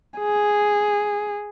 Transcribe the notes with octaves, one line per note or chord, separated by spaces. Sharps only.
G#4